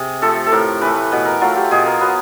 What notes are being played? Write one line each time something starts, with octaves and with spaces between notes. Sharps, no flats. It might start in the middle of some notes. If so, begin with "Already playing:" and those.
Already playing: C3 G#4
F3 A3 A4
A4
A2 A#4
E3 A3 B4
B2 B4
A#4
F#3 A3 F4
G4
B2 G#4
A#4
F#3 B3 B4